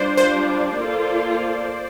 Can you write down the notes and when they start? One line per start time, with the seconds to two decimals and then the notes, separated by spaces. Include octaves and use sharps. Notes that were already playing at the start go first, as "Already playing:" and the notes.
Already playing: G3 D4 F4 C5 D5
0.17 C5
0.76 A#3 F4 A4